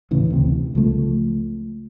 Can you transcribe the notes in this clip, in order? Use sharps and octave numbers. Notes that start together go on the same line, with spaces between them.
A1 D#2 C#3 E3
D2 C3
C#2 F3 A3